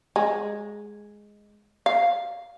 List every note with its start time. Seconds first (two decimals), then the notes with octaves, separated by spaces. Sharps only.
0.16 G#3
1.86 F5